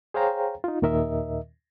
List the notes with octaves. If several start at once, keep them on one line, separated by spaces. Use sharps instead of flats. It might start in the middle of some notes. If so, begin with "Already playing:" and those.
G#4 C5 C#5 F5 G5 A#5
D#4 F4
D#2 A#2 D#3 A#4 D#5 E5